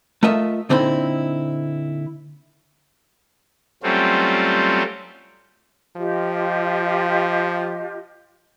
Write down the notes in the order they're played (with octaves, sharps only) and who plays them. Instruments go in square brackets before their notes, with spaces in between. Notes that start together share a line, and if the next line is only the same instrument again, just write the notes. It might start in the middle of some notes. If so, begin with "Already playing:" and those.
[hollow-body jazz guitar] A3 F4 A#4 D#5 E5
A#2 D3 C4 D#4 E4
[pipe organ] F#3 G3 A3 C4 C#4 F4
[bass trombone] F3 [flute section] F4 G4 D#5